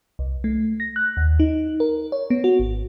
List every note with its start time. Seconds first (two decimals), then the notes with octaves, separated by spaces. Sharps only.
0.19 C2
0.44 A3
0.80 A#6
0.96 F#6
1.17 D#2
1.40 D#4
1.80 A#4
2.12 C#5
2.30 B3
2.44 F#4
2.59 G#1